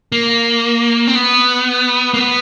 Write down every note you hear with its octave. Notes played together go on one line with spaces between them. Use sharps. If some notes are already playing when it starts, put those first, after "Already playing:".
A#3
C4
B3
A#3
B3